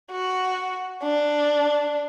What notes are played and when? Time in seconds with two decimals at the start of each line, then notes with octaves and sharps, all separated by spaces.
0.11 F#4
1.03 D4